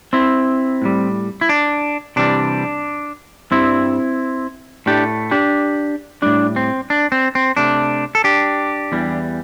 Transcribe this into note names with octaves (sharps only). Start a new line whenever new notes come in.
C4 E4
A2 G3
E4
D4
C3 E3 G3 D4
G2 G3 C4 E4
A2 A3 D4 G4
D4 G4
A2 G3 D4
C4
D4
C4
C4
C3 A3 D4
A4
D4 G4
E2 E3 G3